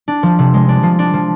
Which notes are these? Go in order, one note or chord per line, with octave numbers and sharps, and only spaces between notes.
D4
F3
C3
G#3
D4
F3
D4
F3